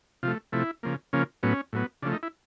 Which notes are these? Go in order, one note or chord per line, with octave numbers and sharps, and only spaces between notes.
C3 F3 A3 F4
C3 F3 A3 E4
C#3 F3 A#3
C#3 F3 A#3 C#4
A2 F#3 B3 C#4
A2 F#3 B3
C#3 F3 A3 D4
D#4
E4